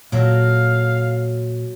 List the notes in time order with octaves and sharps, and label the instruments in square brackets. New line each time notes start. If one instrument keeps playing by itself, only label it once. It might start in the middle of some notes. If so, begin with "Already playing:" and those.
[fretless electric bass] A#2 [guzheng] F#3 A3 A#3 [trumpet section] F5